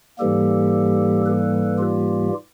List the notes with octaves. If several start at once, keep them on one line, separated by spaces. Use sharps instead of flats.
G#2 E3 G3 A#3 G4 A4
A4 B4
F4 G4